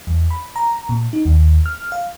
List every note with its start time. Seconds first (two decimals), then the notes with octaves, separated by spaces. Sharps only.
0.07 E2
0.30 B5
0.56 A#5
0.89 A#2
1.13 D#4
1.25 D#2
1.66 F6
1.92 F5